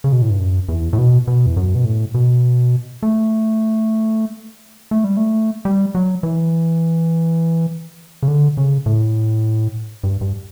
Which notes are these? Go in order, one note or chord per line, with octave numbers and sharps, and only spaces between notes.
C#3
B2
A2
G2
F#2
E2
A2
B2
B2
E2
F#2
B2
A2
B2
A3
A3
G3
A3
G3
F#3
E3
C#3
D3
C#3
A2
G2
G2